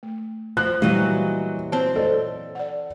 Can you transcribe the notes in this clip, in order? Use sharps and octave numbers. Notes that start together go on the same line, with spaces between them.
A3
F3 F#6
A#2 E3 F#3 G3 D#5 F5
C4 C5 C#5 G5 A5
A4 C5 D5 D#5
D5 F#5